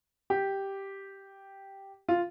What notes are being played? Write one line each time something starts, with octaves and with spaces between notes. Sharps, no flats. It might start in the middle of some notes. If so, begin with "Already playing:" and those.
G4
F4